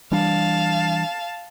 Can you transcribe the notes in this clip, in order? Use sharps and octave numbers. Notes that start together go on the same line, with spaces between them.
E3 G3 D4 F5 A5